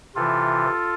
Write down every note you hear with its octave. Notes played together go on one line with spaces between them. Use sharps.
C3 E3 F4 A4